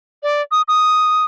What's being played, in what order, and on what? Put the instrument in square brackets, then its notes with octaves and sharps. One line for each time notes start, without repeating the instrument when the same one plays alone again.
[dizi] D5
D#6
D#6